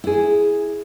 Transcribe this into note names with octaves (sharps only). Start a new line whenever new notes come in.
E4 G#4